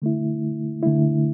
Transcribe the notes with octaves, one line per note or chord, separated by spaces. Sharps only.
D3 A3 E4
D3 A3 E4